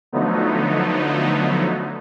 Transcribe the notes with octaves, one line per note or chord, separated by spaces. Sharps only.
D3 F3 F#3 A3 B3 D#4